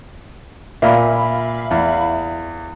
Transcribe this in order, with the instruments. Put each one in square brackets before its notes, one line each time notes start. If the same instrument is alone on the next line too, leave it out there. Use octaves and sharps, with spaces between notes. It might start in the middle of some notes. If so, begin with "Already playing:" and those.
[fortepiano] A#2 [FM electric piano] E5 F5 B5
[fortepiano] E2